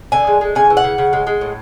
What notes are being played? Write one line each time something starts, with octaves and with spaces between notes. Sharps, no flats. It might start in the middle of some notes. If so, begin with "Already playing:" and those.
D3 G#5
G#3
G#3
C#3 G#5
E3
F#5
C#3
C#3
G#3
G#3
A2